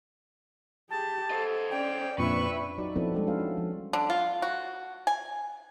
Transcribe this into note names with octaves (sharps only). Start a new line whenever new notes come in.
G4 G#4 A5
A4 C5 D#5
C#4 D5 G5
F2 A#2 D4 B4 E5 B5 C#6
F#3 D#4 F#4 D5
F3 B3 C4 E4 A4 B4
G3 G#3 D4 A4
C#4 D#4 F#4 C5 F5
F4
F3
D3
F4
F#4
G#5